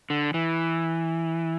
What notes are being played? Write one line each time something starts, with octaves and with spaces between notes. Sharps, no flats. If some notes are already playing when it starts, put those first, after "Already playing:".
D3
E3